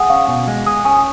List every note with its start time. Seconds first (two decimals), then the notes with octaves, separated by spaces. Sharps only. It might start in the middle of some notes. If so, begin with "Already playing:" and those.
Already playing: G#4 F#5
0.10 C#4 F5
0.28 B2
0.48 G#3
0.66 G#4
0.85 C#4 G#5